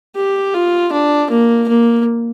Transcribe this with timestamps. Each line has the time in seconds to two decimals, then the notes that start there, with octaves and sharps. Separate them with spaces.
0.16 G4
0.54 F4
0.92 D4
1.31 A#3
1.69 A#3